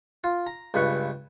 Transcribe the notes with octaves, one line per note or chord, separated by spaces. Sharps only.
F4
A#5
C#2 G2 B4 C#6